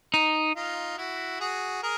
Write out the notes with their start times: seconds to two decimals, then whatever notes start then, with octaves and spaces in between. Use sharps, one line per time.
0.14 D#4
0.56 D#4 F4
0.98 E4 F#4
1.40 F#4 G#4
1.83 G#4 A#4